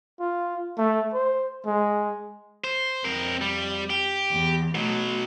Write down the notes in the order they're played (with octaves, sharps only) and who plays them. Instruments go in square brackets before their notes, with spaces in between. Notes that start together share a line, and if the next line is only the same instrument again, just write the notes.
[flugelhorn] F4
A3
C5
G#3
[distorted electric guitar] C5
[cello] F2 [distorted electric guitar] C4 A#4
[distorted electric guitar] G3
G4
[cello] E2
[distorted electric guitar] B2 F#3 [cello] A3